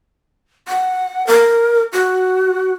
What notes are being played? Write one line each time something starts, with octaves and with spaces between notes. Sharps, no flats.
F#5
A#4
F#4